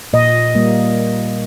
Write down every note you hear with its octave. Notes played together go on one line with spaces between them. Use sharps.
A#2 D#5
G3 A#3